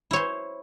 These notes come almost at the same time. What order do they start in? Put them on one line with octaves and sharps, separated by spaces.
E4 C#5 C5